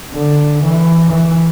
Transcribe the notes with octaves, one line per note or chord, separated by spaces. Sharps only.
D3
E3
E3